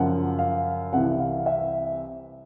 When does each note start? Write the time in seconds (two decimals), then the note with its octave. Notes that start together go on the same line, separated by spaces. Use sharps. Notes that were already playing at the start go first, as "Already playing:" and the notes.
Already playing: F#2 C#3 F3 F#5
0.39 F5
0.93 C2 C3 E3 F#5
1.20 F5
1.46 E5